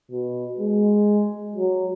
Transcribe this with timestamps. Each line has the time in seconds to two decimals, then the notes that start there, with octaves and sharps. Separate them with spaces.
0.11 B2
0.59 G#3
1.55 F#3